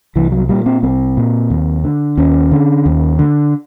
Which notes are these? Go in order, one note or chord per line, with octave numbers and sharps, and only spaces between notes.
C2 E3
F#3
A#2 G3
C4
C2 C4
A#2
D#2
D3
D#2 C#4
D3
D#2
D3